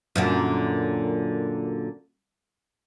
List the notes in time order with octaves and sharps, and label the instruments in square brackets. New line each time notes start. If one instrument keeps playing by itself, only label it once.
[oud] F#2 A#2 D3